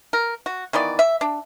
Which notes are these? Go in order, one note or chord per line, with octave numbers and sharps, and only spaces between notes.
A#4
F#4
D#3 E3 B3 D5
E5
D4